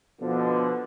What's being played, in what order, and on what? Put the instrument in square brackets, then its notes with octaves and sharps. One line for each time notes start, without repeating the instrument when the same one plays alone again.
[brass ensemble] B2 D3 F3